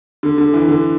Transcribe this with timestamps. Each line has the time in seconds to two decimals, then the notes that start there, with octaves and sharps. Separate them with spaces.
0.23 D3
0.38 D3
0.53 E3
0.68 D3